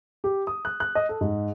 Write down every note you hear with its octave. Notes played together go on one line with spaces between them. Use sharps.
G4
D#6
F#6
F#6
D#5
A4
G#2